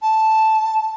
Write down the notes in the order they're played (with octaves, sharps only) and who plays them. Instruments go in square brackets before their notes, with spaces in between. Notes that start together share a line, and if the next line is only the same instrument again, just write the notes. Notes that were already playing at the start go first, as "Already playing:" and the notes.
[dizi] A5